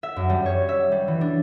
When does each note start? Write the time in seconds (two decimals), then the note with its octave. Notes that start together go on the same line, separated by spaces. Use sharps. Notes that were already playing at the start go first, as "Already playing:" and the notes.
0.03 E5
0.16 F#2
0.30 G3
0.46 C#5
0.69 E5
0.92 G3
1.08 E3
1.21 D4